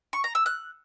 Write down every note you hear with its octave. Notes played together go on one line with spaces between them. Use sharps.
C#6
A#5
E6
F#6